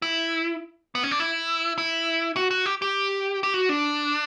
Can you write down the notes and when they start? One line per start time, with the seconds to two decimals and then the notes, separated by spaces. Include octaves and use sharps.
0.02 E4
0.95 B3
1.03 C#4
1.11 D4
1.20 E4
1.78 E4
2.37 F#4
2.51 F#4
2.66 G4
2.82 G4
3.44 G4
3.54 F#4
3.69 D4